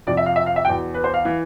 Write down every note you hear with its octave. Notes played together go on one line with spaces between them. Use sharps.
F2 C3 F3 D5
E5
F5
E5
F5
E5
E2 B2 G5
B4
C5
F5
E3